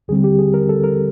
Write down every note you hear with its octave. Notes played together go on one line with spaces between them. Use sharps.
D#2 D3 G3 C4 G#4
G4
G#4
A#4
A4
A#4